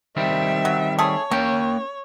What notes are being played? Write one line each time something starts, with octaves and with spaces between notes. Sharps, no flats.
D#3 G3 C4 E5
F#3
A3 G#4 C#5
A#3 C#4 G5